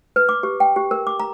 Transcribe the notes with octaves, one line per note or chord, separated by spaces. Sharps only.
B4
D6
G4
G5
G4
A#4
D6
A#5